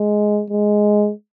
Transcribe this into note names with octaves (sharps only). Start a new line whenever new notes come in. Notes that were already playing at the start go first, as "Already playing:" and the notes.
Already playing: G#3
G#3